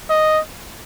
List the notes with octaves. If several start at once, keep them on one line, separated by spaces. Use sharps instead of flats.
D#5